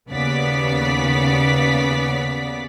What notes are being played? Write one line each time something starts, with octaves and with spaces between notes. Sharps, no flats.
D#2 C#3 B3 D5 B6